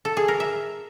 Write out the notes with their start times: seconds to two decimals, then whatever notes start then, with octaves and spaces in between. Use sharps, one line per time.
0.05 A4
0.17 G#4
0.28 A#4
0.40 E5